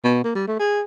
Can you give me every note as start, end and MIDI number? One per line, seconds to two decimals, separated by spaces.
0.04 0.24 47
0.24 0.33 58
0.35 0.45 55
0.47 0.59 57
0.59 0.83 68